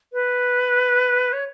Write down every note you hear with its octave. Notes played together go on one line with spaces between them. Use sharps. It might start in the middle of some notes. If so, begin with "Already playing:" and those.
B4
C#5